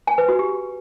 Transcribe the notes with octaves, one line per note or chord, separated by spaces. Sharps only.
G#5
B4
F#4
G4